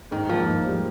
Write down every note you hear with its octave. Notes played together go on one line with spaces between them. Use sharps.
G#2 D#3
F3 A#3
G#2
G3